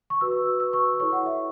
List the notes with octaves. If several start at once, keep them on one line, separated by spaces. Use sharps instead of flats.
C#6
F#4 B4 E6
E6
C#6
E4 A4 C#5 C#6
F#5
E5